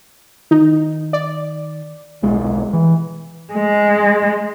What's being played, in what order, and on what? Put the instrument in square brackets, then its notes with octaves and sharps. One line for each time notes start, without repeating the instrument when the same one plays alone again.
[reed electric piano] D#3 [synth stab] D#4
[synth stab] D5
[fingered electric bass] D#1 B1 G#3
E3
[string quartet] G#3